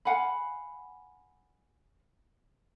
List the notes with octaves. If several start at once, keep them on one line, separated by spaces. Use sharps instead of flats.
F5 F#5 G#5 B5